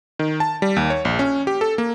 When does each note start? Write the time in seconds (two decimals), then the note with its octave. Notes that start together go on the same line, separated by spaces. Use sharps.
0.19 D#3
0.40 A5
0.62 G3
0.76 D#2
0.90 C#5
1.05 A#1
1.19 C#4
1.47 G4
1.61 A4
1.78 A#3